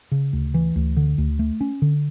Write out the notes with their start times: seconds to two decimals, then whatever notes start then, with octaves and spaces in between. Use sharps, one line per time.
0.12 C#3
0.33 D2
0.54 E3
0.76 D2
0.97 D3
1.18 D2
1.39 A3
1.61 C#4
1.82 D3